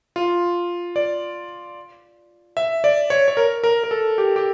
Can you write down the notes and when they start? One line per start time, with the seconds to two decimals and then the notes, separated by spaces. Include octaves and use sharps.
0.16 F4
0.96 D5
2.57 E5
2.84 D5
3.10 C#5
3.28 C#5
3.37 A#4
3.64 A#4
3.84 A#4
3.91 A4
4.18 G4
4.36 G4